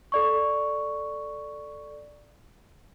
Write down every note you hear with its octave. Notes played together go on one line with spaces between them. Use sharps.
A4 D5 C#6